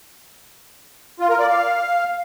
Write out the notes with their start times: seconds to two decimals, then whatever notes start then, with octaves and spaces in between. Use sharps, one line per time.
1.20 F4
1.30 A#4
1.39 D5
1.49 F5